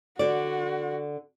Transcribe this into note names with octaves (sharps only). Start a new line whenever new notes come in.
D3 F#4 D5